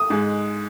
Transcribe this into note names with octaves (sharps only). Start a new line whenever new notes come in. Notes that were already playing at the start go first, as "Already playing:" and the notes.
Already playing: D#6
G#2 G#3